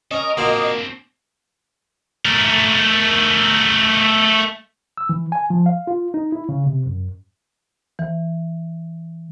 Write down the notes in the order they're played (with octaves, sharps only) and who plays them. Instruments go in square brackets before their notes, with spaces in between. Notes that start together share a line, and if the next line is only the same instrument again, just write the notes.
[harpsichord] C#4 [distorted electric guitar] A4 A#4 [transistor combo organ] D#5
[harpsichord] A#2 F#4 [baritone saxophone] A#3 [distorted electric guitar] C4 D4
[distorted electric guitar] A3 A#4
[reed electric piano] E6
E3
G#5
F3
F5
F4
D#4
E4
C#3
C3
F#2
[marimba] E3